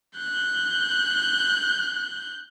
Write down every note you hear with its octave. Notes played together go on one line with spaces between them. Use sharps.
F#6 G6